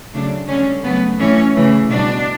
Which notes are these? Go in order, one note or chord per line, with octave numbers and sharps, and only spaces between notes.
C#3 F#3 A3 D4
D3 G3 C#4
C#3 F#3 A3 B3
A2 E3 A3 C#4
C#3 E3 A3
B2 G3 D4